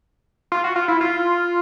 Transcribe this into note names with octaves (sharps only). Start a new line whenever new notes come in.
F4
F#4
F4
E4
F4